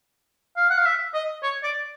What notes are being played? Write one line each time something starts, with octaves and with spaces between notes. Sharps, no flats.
F5
F#5
F5
E5
D#5
C#5
D5